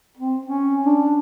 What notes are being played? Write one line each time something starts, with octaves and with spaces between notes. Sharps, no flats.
C4
C#4
D4